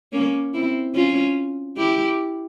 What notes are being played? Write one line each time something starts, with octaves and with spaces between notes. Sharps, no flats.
A#3 C#4
C4 E4
C#4 F4
E4 G4